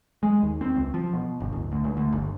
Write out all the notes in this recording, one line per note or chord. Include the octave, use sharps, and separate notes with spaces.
G#3
D#2
C4
C#2
F3
B2
G1
D1
D2
C#2
D2
G1